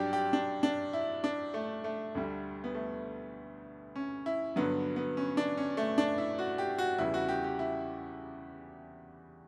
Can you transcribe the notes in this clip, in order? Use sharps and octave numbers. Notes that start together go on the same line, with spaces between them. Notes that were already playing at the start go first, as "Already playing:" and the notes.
Already playing: G2 F#3 D4 G4
G4
D4
D4
E4
D4
A3
A3
D2 D3 G3
B3
A3
C#4
E4
G2 D3 F#3 B3
B3
C#4
D4
C#4
A3
D4
E4
F#4
G4
F#4
E2 C#3 E3 G3 E4
F#4
G4
G4
E4